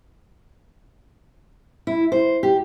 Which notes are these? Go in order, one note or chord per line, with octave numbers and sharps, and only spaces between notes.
E4
C5
G4